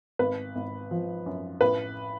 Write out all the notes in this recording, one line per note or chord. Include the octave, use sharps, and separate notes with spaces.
G#1 B4
G#1
F3
F#2
A1 B4